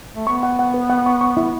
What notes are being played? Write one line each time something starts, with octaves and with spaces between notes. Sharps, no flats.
A3
B3 C#6
F#5
F#5
B4
F#5
C#6
C#6
E4